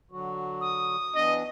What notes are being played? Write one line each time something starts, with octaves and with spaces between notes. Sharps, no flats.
D3 F#3 F#4
D#6
E3 B3 D4 D#5